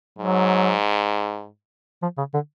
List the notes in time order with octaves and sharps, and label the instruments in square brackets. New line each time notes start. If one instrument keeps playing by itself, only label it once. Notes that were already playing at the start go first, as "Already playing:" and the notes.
[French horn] G#2 [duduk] F#3
[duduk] F3
C#3
D3